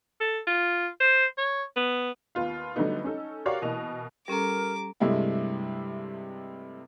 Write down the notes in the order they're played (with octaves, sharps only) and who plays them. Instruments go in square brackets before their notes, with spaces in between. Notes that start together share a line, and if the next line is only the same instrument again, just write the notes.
[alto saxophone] A4
F4
C5
C#5
B3
[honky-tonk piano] D#2 B3 F4 F5
D3 F#3 G3 A3 B3 D#4
C#4 D#4 A4
F#4 G4 A#4 C#5 D5 F5
B2 E3 A#3 D#5 F7
[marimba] G3 C#4 A4 [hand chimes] G4 A#5 [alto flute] A#4 [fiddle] D6
[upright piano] G2 C3 G#3 A3 E4